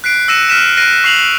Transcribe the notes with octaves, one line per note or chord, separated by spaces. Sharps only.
F#6 B6 C7 D7
E6 F#6 A#6 C#7 D#7 E7
F6 F#6 B6 D#7 E7
F#6 A#6 C7 D7 D#7
C#6 C7 F7 F#7